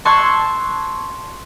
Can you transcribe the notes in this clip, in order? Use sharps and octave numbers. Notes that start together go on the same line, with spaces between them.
A5 C6 C#6 E6 F#6 G#6